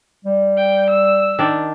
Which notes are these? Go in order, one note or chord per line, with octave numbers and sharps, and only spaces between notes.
G3
G5
E6
D#3 D4